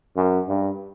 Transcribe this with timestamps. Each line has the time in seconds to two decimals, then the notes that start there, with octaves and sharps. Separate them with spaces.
0.17 F#2
0.48 G2